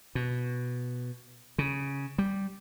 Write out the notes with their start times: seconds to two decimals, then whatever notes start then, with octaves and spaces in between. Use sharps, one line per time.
0.15 B2
1.58 C#3
2.18 G3